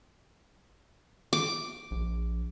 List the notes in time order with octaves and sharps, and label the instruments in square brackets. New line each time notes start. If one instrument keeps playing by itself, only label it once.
[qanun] D6
[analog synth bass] A#1